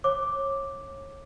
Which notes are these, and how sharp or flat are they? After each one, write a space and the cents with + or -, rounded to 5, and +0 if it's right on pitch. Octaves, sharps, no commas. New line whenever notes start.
C#5 -25 F5 +0 D6 +0